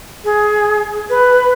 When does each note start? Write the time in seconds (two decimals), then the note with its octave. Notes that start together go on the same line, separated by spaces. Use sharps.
0.24 G#4
1.09 B4